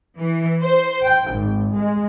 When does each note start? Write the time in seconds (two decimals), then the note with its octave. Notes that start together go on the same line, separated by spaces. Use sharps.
0.18 E3
0.62 C5
1.05 G5
1.35 G#1
1.75 G#3